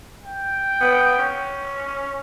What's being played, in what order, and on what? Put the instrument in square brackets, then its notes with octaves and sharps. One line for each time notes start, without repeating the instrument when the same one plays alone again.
[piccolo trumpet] G5
[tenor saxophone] B3
C#4